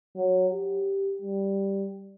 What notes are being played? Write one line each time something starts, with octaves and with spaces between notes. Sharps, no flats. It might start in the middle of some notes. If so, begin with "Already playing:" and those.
F#3
G4
G3